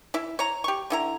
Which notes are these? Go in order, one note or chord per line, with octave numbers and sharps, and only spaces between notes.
E4 E5
C#5 A#5
G4 C#6
D3 E4 A#5